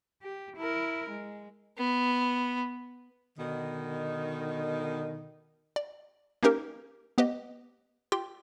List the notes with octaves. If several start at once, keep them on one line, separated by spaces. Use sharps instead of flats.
G4
E4 A#4
G#3
B3
B2 D3 D#3
D5
A#3 C#4 D#4 G4 A#4
B3 G4 B4 D#5
F4 G4 G5 C6